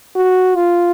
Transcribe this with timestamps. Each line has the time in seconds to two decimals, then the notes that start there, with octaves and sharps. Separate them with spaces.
0.15 F#4
0.55 F4